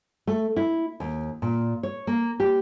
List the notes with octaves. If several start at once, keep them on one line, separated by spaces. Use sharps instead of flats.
A3
E4
D#2
A#2
C#5
A#3
G4